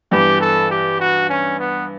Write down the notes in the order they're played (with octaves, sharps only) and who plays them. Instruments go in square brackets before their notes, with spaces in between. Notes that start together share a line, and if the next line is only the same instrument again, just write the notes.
[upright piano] G2 E3 B3 [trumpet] G4
[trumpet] A4
G4
F#4
C#4
B3